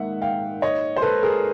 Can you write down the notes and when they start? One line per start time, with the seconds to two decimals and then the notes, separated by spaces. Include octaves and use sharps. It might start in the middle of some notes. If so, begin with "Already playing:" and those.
Already playing: G#2 D#3 A#3 E5 F#5
0.22 F5 G5
0.62 C#5 D#5
0.96 C5
1.02 A4 B4
1.23 G#4 A#4